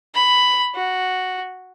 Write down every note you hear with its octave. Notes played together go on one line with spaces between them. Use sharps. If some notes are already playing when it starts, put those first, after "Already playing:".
B5
F#4